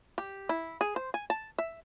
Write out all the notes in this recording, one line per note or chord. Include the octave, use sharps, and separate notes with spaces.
G4
E4
G#4
C5
G#5
A5
E5